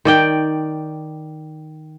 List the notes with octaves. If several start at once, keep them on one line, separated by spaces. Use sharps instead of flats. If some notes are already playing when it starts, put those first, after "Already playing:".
D#3 D5 G5